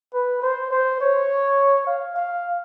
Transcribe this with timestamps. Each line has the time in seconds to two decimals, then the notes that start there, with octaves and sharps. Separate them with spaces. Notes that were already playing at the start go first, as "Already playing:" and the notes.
0.14 B4
0.42 C5
0.71 C5
1.01 C#5
1.87 F5
2.16 F5